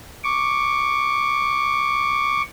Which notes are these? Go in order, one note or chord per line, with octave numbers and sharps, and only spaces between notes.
C#6 D6